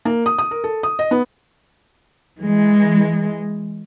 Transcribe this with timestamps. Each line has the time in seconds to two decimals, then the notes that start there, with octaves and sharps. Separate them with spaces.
0.05 A#3
0.26 D#6
0.39 D#6
0.51 A#4
0.64 A4
0.83 D#6
0.99 D#5
1.11 B3
2.38 E3 G#3